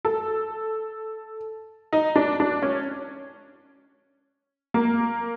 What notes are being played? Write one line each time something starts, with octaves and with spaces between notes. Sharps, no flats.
A4
D#4
D4
D4
C#4
A#3